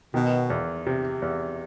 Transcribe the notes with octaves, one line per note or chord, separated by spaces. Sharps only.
B2 D#3
E2
C3
E2